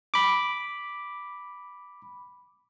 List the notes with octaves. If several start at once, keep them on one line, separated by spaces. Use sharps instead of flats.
B5 D6